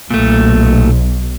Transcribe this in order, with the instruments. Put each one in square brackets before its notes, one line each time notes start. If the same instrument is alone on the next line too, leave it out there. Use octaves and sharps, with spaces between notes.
[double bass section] B1 [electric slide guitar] A#2 A3